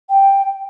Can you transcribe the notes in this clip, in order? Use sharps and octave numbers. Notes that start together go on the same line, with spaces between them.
G5